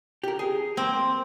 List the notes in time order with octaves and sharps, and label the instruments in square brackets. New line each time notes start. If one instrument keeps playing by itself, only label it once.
[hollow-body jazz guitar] G4 A#4
G#4
[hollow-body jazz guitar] A#3 [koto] C4